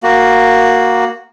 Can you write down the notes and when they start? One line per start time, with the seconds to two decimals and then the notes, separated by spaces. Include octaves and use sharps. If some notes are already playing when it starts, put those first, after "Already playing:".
0.03 A#3 F#4